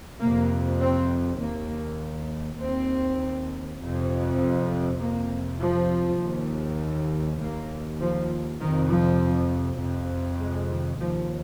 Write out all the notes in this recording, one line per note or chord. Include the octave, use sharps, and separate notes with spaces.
F2 C3 A#3
C4
D#2 A#3
D#2 C4
F2 C3
F2 C3 A#3
F3
D#2
D#2 A#3
F3
F2 C3 D#3
F3
F2 C3
G#3
D#3
D#2 F3